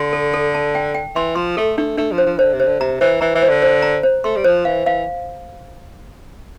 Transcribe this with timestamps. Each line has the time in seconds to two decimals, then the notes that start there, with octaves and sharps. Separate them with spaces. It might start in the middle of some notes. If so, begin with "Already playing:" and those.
Already playing: D3 C6
0.13 A4
0.34 A4
0.55 A5
0.75 G5
0.94 G5
1.15 E3 C6
1.36 F3 C6
1.57 A3 A4
1.77 A3 D4
1.98 A3 D4
2.12 F3
2.18 C5
2.26 F3
2.38 D3 C5
2.53 C3
2.60 C5
2.66 D3
2.80 C3 A#5
3.01 E3 C5
3.21 E3 A#5
3.35 E3
3.42 C5
3.49 D3
3.62 C5
3.82 A#5
4.03 C5
4.24 A3 C6
4.36 G3
4.44 F3 C5
4.65 E3 F5
4.85 E3 F5